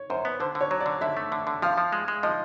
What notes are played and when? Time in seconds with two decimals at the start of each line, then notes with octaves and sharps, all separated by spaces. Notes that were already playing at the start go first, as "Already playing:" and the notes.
Already playing: C#5
0.10 F#2 C5
0.25 B3
0.40 D3 C5
0.55 D3
0.61 C#5
0.71 F#3
0.80 D5
0.86 D3
1.01 D3 E5
1.17 A3
1.32 D3
1.47 D3
1.62 F3 F5
1.78 F3
1.92 G#3
2.08 G#3
2.23 F3 D#5